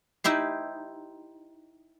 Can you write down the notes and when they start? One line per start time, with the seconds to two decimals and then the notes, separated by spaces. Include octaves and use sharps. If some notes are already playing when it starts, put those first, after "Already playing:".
0.24 D#4 E4 G4 C5